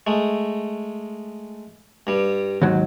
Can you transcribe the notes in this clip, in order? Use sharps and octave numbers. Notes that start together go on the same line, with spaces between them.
G#3 A3
G2 G3
D#2 G#2 F#3